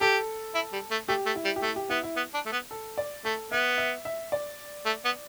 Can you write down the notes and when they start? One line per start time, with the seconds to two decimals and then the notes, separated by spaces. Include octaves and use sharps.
0.01 G4 A4
0.55 E4
0.73 G3
0.91 A3
1.08 A3 G4
1.26 A3
1.36 E4
1.45 G3
1.56 G4
1.63 A3 E4
1.76 G4
1.90 B3 E4
2.03 E4
2.16 B3
2.34 D4
2.46 A3
2.52 B3
2.71 A4
2.98 D5
3.25 A3 A4
3.51 B3 E5
3.78 E5
4.05 E5
4.32 D5
4.86 A3
5.05 B3